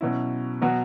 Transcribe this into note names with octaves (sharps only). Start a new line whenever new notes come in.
B2 F#3 C#4 E4
B2 F#3 B3 F#4